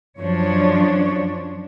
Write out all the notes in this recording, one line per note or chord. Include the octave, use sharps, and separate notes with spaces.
F#2 F3 D4 C#5